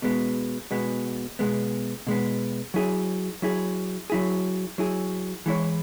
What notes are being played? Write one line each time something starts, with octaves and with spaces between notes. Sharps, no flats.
B2 G#3 B3
B2 G#3 B3
B2 G#3 B3
B2 G#3 B3
F#3 E4 G#4
F#3 E4 G#4
F#3 E4 G#4
F#3 E4 G#4
E3 G#3 E4 C#5